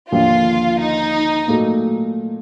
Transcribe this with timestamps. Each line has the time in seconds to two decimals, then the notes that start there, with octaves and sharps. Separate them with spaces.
0.12 D#2 D3 F3 A#3 F4
0.80 D#4
1.48 A#2 F#3 A3